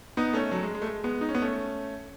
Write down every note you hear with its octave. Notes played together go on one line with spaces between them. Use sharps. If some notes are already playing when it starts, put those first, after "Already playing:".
B3 D#4
A3 C#4
F#3 A3
G#3
G#3
A3
G#3
G#3 B3
D#4
C#4
B3
A3 C#4